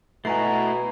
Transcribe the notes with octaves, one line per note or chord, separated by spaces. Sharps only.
B2 A3 E4 F#4 G#5 A#5 C7